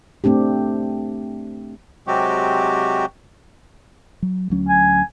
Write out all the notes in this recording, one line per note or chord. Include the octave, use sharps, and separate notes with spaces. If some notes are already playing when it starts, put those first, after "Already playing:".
A3 C4 D4 G4
C3 F#3 G#3 C4 F#4 G4
F#3
D2 F#3 C#4
G#5